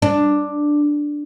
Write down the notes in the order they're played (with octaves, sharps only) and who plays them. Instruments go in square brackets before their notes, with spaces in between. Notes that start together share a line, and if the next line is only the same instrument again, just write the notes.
[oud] D4